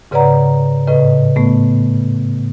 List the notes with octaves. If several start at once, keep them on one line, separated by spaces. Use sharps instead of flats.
G#2 C#3 B4 D5 F#5 A#5
A2 C#3 B4 D#5
A2 A3 B3